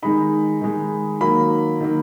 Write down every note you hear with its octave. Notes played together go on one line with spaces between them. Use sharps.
D#3 G#3 D#4 B5
D#3 G#3 D#4
D#3 F#3 A#3 B5
D#3 F#3 A#3